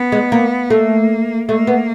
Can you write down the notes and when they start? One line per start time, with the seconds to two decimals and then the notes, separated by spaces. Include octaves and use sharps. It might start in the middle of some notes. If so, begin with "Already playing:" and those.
Already playing: B3
0.12 G#3
0.32 A#3
0.70 A3 A#3
1.49 A3 A#3
1.67 B3